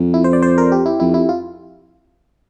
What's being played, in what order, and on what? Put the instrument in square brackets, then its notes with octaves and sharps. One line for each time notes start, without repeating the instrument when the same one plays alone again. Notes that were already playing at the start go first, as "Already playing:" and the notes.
Already playing: [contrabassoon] F2
[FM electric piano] E4
C5
D5
C5
A#4
G4
E4
[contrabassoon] F2 [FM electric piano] E4
[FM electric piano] E4
F4